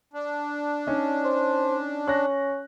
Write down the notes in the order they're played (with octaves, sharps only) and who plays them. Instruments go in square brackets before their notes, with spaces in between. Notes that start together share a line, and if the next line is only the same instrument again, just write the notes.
[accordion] D4
[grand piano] C#4 D#4
[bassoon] C5
[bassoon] C#4 [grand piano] F#6 A#6